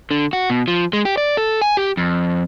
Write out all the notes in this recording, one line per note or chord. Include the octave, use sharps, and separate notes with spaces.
D3
F#4
B2
F3
G#3
G4
D5
A4
G#5
G4
F2